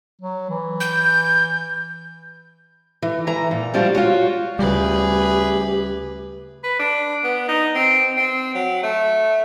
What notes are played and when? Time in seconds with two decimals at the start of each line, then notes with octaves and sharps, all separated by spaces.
0.21 F#3
0.50 E3
0.80 G6
3.02 E3
3.27 E3 A#5
3.51 A#2
3.74 F3 G3 D4 F4 F#4
3.95 F4 F#4 C#5
4.59 D2 C#3 G3 G4 G#4 B4
6.64 B4
6.79 D4
7.23 B3
7.48 D#4
7.75 C4
8.17 C4
8.55 F#3
8.83 A3